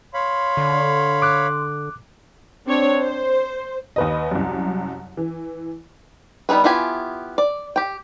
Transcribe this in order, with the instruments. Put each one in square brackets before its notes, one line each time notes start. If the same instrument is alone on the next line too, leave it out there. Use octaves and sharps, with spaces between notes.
[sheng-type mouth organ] C#5 F5 B5 [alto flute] C6
[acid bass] D3
[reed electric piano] D6 F#6
[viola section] C4 D4 C#5
C5
[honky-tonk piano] D#2 B4 D#5
C2 F#2
E3
[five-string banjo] G3 B3 D#4 G#4 B4
B3 E4 F4 G4 G#5
D5
G4 G5